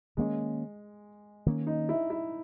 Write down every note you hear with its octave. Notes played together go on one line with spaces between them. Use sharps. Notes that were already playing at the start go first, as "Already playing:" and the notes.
D#3 G#3 A#3 C#4
D#3 A#3 C#4
D#4
E4
E4